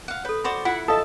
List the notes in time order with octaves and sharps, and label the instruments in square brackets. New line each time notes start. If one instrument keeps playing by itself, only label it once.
[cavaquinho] F5 F#5
[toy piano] A4 C#5 [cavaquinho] B4
[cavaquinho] F#4 C5 D5 [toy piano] B5
[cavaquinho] E4 [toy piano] F4 [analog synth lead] F#5
[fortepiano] A4 [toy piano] D#5 F5 D#6 [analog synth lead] A5